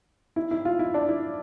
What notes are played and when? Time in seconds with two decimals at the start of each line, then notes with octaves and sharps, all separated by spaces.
0.36 E4
0.51 E4
0.65 F4
0.79 E4
0.94 D4
1.09 E4